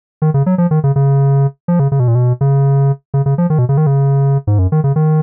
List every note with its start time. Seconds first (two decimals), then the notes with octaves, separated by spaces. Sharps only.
0.22 D#3
0.34 C#3
0.46 F#3
0.58 F3
0.71 D#3
0.84 C#3
0.96 C#3
1.68 F3
1.80 C#3
1.92 C#3
2.00 B2
2.08 A#2
2.15 B2
2.41 C#3
3.14 C#3
3.26 C#3
3.38 F3
3.50 D#3
3.59 B2
3.69 C#3
3.77 D#3
3.87 C#3
4.47 G#2
4.59 F#2
4.72 D#3
4.84 C#3
4.96 D#3